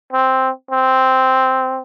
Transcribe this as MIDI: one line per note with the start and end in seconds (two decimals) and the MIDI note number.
0.13 0.50 60
0.71 1.80 60